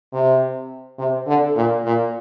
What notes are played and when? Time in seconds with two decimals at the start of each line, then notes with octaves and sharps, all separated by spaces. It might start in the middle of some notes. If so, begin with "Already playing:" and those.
0.13 C3
0.98 C3
1.27 D3
1.56 A#2
1.85 A#2